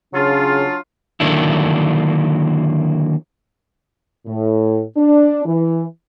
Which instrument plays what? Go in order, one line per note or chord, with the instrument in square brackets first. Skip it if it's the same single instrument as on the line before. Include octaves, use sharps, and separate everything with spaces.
[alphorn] C#3 [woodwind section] F#3 D4 F4
[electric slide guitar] D3 D#3 F#3 A#3 D4 E4
[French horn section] A2
D4
E3